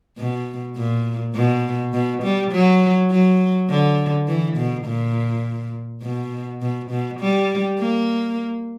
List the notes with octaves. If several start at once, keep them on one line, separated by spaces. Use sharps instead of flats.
B2
A#2
B2
B2
G3
F#3
F#3
D3
E3
B2
A#2
B2
B2
B2
G3
A#3